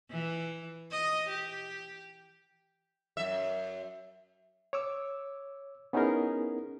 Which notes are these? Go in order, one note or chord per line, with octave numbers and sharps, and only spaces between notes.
E3
D#5
G4
F#2 E5
C#5 D6 E6
B3 C#4 D#4 E4 G#4 A#4